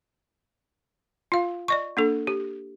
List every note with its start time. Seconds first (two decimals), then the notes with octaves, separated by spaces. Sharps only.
1.32 F4 F5
1.68 D5 D#5 C#6
1.97 A#3 D4 A4
2.27 G4